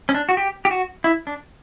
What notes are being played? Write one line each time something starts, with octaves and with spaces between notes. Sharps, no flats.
C#4
D4
F#4
G4
G4
F#4
E4
D4